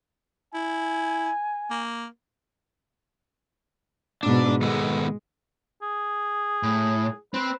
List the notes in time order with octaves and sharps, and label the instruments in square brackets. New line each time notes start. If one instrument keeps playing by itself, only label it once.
[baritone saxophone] E4 [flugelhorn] G#5
[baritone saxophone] A#3
[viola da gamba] G#2 B2 [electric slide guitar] D4
[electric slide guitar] D#3 B3 A4 [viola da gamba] G#3
[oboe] G#4
[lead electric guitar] A2
[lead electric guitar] C4 [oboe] B4